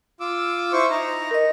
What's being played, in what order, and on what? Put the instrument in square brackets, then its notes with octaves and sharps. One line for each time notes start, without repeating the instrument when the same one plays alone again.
[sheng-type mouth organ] F4 D6 E6
E4 C5 C#6
D#4 A#5
[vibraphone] A#4 D#5